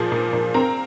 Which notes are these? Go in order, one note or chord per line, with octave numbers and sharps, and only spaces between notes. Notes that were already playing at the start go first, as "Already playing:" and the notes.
Already playing: A#2 F3 G#4
A#2
A#2
C4 A#4 A#5